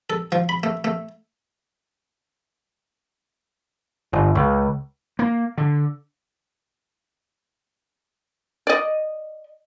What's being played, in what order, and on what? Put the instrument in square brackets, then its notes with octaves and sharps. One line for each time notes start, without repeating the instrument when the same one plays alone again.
[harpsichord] A4
F3
B5
A3
A3
[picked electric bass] G1
C#2
[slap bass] A#3
D3
[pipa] D5 D#5